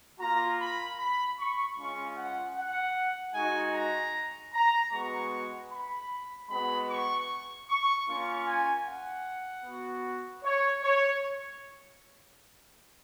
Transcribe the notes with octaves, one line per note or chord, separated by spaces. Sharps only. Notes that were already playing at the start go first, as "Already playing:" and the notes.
A#3 F4 A#5
B5
B5
C#6
G#3 C#4 F4 C#6
F#5
F#5
G#3 D#4 F#4 G#5
A#5
A#5
G#3 B3 F#4 C#6
B5
G#3 B3 F#4 B5
C#6
C#6
A#3 C#4 F4 C#6
G#5
F#5
B3 F#4
C#5
C#5